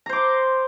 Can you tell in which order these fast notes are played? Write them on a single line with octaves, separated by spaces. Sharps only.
A#5 C5 D6 C6